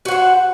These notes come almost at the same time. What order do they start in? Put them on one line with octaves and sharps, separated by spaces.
F#4 F#5 C5